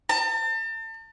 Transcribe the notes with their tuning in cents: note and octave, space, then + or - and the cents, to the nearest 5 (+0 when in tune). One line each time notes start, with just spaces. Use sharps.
A5 +40